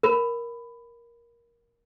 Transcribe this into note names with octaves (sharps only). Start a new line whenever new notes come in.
A#4 B5